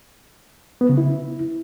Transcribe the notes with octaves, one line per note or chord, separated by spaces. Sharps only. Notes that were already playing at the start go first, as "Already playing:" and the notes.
B3
C#3
E4